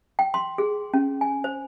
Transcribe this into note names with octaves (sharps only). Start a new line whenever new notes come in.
G5
C6
G#4
C#4
G#5
C5